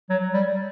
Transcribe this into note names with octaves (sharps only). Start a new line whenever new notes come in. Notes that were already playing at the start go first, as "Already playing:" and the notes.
F#3
G3